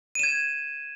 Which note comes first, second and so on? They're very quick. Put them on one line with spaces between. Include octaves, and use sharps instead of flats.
D#7 E7 G#6